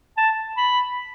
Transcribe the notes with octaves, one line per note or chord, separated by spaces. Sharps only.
A5
B5